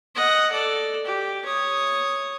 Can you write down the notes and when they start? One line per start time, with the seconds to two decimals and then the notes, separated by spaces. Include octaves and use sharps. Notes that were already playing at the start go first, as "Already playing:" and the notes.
0.15 D#5 F#5
0.52 A4 D5
1.05 G4
1.45 C#5 D#6